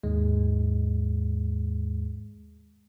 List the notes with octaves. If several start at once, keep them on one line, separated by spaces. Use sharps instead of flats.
D#2 G#2 G#3